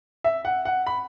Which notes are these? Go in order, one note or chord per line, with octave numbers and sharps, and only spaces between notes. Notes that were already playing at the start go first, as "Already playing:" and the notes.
E5
F#5
F#5
B5